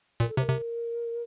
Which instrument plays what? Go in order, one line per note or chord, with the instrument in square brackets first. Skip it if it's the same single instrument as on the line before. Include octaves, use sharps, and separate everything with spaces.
[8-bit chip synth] A#2 [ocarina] A#4
[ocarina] A4
[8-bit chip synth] C3 [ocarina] C5
[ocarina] A#4
[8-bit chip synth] C3